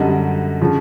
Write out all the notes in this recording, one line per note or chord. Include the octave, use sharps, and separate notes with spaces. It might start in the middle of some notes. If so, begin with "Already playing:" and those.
Already playing: F#2 D3 G3 D#5
C#3 F3